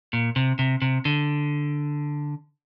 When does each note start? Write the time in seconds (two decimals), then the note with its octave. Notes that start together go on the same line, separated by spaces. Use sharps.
0.13 A#2
0.36 C3
0.59 C3
0.82 C3
1.05 D3